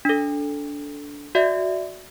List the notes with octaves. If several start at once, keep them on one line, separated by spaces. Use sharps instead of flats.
D4 A4
F#4 D5 E5